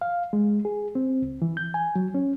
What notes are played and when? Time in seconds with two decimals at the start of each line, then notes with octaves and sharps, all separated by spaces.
0.01 F5
0.33 G#3
0.65 G#4
0.95 C4
1.22 C#2
1.42 E3
1.57 G6
1.74 G#5
1.96 F#3
2.15 C#4